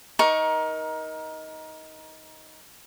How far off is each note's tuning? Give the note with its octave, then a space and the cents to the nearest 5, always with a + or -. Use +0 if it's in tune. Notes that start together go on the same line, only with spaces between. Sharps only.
D#4 +15 A#4 +25 C#6 +0